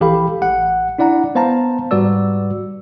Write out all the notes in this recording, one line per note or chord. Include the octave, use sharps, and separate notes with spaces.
A#1 E3 G4 A4 F5 B5
A1 F#5
D4 E4 D5 F#5 A#5
B3 C5 F5 A5 A#5
G#2 G3 F#4 B4 D5 E6